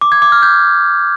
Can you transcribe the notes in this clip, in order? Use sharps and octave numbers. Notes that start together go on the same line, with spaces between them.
D6
G#6
D6
F6
G6